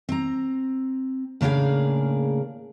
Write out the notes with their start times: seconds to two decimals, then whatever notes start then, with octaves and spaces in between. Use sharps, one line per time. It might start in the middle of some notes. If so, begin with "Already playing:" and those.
0.09 C4 A#5
1.41 A2 C#3 A#3 D4 G#4 F5